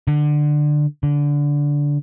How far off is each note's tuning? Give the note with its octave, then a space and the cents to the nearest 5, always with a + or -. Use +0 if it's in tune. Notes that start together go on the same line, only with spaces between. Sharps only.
D3 +15
D3 -15